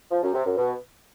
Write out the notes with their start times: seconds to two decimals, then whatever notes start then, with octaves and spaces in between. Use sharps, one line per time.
0.11 F3
0.23 F#2
0.34 C3
0.46 F#2
0.57 B2